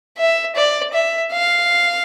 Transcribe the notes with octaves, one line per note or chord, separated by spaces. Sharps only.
E5
D5
E5
F5